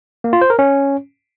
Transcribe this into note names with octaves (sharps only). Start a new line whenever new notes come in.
A#3
F4
C5
A#4
C#4